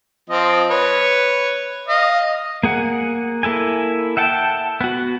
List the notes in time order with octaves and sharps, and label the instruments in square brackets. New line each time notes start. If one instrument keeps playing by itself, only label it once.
[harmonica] F3 C4 D#5
B4 C#5
D#5 F5
[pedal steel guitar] A#3 G#4 F#5
A#3 E4 A4 G#5
E5 F#5 G5 A5
B3 F#4